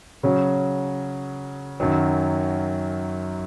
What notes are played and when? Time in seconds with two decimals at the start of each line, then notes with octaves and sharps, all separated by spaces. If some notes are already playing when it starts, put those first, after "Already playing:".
0.23 C#3 F#3 C#4
1.80 F#2 D#3 F#3